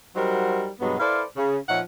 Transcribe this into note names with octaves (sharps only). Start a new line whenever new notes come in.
F#3 G3 D#4 F#4 A#4 C5
G2 B2 F#3 G#3 B3
E4 A4 B4 C5 D5 F5
C#3
A#2 F3 D#4 C#5 E5 F#5